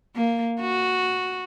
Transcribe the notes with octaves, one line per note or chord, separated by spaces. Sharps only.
A#3
F#4